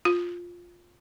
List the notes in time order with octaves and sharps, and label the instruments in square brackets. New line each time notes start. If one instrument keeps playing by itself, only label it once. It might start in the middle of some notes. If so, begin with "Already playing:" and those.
[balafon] F4